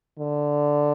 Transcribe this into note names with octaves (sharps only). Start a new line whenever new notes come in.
D3